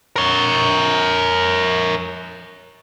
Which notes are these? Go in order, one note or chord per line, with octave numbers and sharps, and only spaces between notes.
A#4 C#5